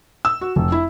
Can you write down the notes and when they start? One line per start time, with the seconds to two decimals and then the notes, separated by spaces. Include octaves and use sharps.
0.25 E6
0.41 F#4
0.56 F1
0.72 E4